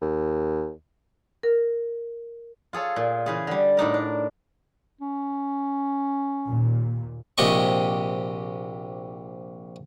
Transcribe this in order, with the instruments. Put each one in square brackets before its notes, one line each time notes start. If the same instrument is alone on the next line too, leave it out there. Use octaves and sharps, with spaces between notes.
[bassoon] D#2
[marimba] A#4
[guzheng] F4 G#4 A4 C#5
A#2
C#3 E3 G#4
D3 G3
A2 D4 D#4 A#4
D4
[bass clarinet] C#4
[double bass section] D#2 A#2
[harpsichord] A#1 C3 G4 D#5 C#6